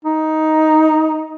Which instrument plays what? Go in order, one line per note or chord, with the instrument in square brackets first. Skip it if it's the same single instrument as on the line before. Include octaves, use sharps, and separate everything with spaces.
[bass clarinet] D#4